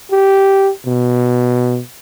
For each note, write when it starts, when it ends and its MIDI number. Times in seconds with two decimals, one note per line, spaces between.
0.12 0.71 67
0.86 1.80 47